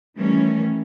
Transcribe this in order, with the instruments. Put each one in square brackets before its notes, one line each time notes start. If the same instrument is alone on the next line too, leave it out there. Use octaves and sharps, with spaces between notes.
[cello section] D#3 E3 G3 A3 C#4